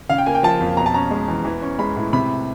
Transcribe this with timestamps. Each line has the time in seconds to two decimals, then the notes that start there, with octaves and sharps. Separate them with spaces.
0.09 C#3 F5
0.18 G5
0.26 A#3 G#5
0.35 G5
0.43 F3 A5
0.61 F2
0.77 B2 A#5
0.86 A5
0.94 C#4 A#5
1.11 G#3
1.28 E2
1.44 E3
1.62 C#4
1.79 G#3 B5
1.96 A2
2.13 C3 B5